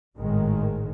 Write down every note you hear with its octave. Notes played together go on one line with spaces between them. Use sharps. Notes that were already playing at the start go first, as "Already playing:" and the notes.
G#1 A2 D#3 G#3